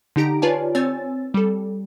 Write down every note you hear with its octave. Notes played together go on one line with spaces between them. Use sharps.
D3 D#4 G4 A#5 D7
F4 B4 C#5 D5 G#5 A5
C4 C#5 G#5 E6 A6
G3 A4